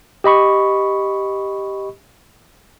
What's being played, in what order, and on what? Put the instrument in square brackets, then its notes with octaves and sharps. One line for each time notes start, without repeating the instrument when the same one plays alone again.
[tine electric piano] G4 D#5 B5 C#6